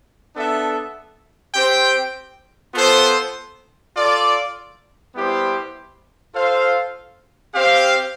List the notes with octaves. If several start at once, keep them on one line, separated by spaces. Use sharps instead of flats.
B3 D4 A4 E5
C4 G4 C5 G5
B3 F4 A4 C5
F4 A4 D5
G3 B3 E4 G4 C5
F4 A4 C5 F5
C4 G4 C5 F5